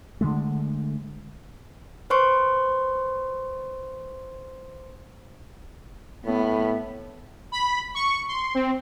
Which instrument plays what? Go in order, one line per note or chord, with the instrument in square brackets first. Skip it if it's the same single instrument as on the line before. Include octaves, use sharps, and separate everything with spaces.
[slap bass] D3 D#3 G#3 A3
[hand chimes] B4 C5 C6 C#6
[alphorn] A2 [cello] B3
[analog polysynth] B5
C#6
C6
C4